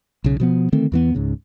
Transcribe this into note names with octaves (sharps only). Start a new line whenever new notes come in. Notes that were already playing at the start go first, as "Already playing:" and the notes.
B1 C#3
B2 F3 B3
D3 D#3 A3 C4
E2 E3 B3
C#2 G#2 C#3